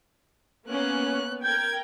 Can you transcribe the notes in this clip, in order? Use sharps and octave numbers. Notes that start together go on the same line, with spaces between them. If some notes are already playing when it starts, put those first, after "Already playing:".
A#3 B3 C#4 F#6
A#4 G5 G6 G#6